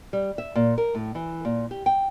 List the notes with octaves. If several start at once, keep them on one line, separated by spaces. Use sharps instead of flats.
G3
E5
A#2
A#4
A2
E3
A#2
G4
G5